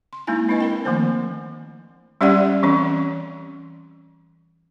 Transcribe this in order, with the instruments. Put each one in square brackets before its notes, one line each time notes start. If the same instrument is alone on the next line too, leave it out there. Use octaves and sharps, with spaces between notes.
[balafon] C6
G#3 A#3 C4 D#4 E4 G#5
C4 D4 E4 B4 D#5
D4 A#4 G5
D#3 F3 A3 A#3 C4 C5
G3 C#4 G4 D5 F#5
E3 C4 C#4